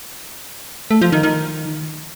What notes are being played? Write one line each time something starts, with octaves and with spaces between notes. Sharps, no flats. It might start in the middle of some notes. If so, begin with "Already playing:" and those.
A3
F3
D#3
D#3